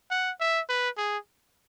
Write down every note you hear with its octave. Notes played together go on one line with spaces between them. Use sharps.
F#5
E5
B4
G#4